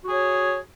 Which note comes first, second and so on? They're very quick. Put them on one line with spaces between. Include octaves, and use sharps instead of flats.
F#4 G#4 C#5